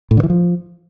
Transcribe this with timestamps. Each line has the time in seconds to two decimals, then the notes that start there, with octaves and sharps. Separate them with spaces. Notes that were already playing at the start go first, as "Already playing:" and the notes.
0.11 A2
0.17 D3
0.23 E3
0.30 F3